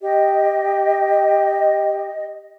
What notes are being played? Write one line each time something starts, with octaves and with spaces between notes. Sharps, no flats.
G4 D#5